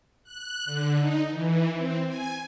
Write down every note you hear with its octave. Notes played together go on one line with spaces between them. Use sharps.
F#6
D3
D#4
E3
C4
G#5